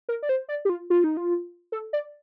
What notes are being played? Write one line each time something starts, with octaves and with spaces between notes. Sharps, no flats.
A#4
D5
C5
D5
G4
F4
F4
D#4
F4
A4
D5